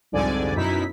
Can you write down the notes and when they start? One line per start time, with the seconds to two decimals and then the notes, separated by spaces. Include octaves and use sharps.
0.12 C2 F2 G#2 D3 D5 G#5
0.56 F#2 B2 D#4 E4 B6